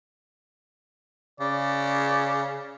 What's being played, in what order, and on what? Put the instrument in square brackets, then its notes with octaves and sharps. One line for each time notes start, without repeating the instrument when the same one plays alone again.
[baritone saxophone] C#3 [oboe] D5